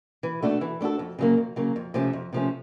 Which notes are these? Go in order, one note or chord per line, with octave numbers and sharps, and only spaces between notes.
E3
A3 D4 F#4 A4
E3
A3 D4 F#4 A4
F2
C#3 F#3 A#3
F2
C#3 F#3 A#3
F2
C3 F3 A3 C#4
F2
C3 F3 A3 C#4